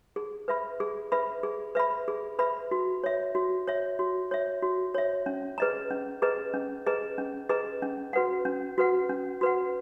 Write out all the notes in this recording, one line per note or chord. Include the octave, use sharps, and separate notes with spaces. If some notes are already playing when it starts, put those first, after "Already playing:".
G#4
B4 E5 B5
G#4
B4 E5 B5
G#4
B4 E5 B5
G#4
B4 E5 B5
F#4
C#5 E5
F#4
C#5 E5
F#4
C#5 E5
F#4
C#5 E5
C#4
G#4 B4 D#5 A#5
C#4
G#4 B4 D#5 A#5
C#4
G#4 B4 D#5 A#5
C#4
G#4 B4 D#5 A#5
C#4
F#4 B4 F#5
C#4
F#4 B4 F#5
C#4
F#4 B4 F#5